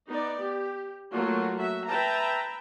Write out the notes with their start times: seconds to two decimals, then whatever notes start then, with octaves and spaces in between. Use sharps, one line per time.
0.11 B3 D#4 D5
0.44 G4
1.13 F#3 A3 A#3 F4 F#4
1.60 F#4 E5
1.89 B4 E5 G5 A5 A#5